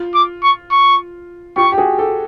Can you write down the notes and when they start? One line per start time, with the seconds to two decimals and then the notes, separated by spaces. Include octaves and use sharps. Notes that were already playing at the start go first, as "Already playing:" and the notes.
Already playing: F4
0.14 D6
0.43 C#6
0.72 C#6
1.56 F4 G4 C#6
1.72 G4
1.78 F#4 G#4
1.99 G4 A4